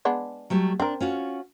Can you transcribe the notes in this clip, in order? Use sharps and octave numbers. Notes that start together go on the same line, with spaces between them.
G#3 B3 D4
F#3 G3 A3
C4 D4 A#4
C#4 F4 F#4